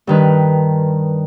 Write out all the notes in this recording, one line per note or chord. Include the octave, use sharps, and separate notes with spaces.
G2 D#3 B4